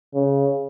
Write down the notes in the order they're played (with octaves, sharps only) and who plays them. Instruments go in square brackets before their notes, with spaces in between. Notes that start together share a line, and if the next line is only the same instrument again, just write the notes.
[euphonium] C#3